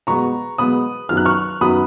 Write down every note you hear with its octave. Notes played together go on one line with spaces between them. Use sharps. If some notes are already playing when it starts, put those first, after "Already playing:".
B2 G#3 B3 A#5 C#6
B2 G#3 B3 B5 D#6
F#2 D#3 F#3 B3 F6
F#6
C#6 F6
F#2 D#3 F#3 B3 B5 D#6